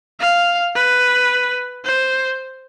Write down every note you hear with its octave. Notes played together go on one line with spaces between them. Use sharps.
F5
B4
C5